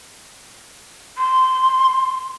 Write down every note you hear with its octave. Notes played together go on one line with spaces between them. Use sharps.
C6